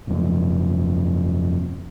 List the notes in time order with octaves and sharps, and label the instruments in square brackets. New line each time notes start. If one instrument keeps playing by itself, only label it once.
[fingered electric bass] G1 F2